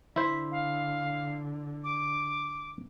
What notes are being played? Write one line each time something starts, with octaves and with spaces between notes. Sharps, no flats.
D3 E4 C5 B6
F5
D6